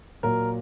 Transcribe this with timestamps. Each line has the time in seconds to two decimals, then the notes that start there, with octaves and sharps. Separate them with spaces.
0.23 A#2 F#3 A#4